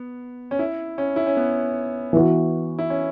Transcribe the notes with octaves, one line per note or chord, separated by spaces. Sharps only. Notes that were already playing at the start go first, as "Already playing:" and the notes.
Already playing: B3
C#4
E4
C#4
E4
C#4
B3
E3 B3 F#4
E4
C#4